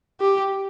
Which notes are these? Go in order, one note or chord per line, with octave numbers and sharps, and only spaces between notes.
G4